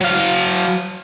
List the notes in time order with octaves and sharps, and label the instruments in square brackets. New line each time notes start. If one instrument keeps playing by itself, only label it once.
[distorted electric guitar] F#3 F5